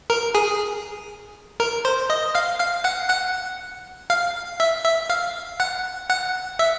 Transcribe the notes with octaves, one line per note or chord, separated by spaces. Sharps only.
A#4 A#5
G#4 G#5
A#4 A#5
C5 C6
D#5 D#6
F5 F6
F5 F6
F#5 F#6
F#5 F#6
F5 F6
E5 E6
E5 E6
F5 F6
F#5 F#6
F#5 F#6
E5 E6